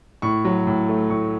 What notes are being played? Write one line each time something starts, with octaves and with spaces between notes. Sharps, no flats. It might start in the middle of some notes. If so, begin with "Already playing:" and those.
A2 C#6
F#3
A2
A3
A2 C#6